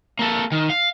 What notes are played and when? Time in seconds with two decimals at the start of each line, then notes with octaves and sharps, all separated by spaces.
0.19 A#3 A4
0.52 D#3
0.70 F5